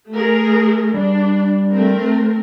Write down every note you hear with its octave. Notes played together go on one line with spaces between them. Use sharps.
A3 G#4 A#4
G3 D4
A3 C4 A#4